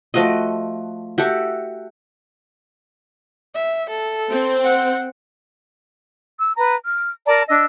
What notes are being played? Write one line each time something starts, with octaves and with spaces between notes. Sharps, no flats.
F3 A3 F#4 D#5
F#4 G4 A4 E5
E5
A4
C4
F#5
E6
B4 A#5
F6
A#4 D5 A5 A#5
D4 D#5 E6